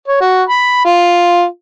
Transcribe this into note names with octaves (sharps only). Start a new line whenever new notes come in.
C#5
F#4
B5
F4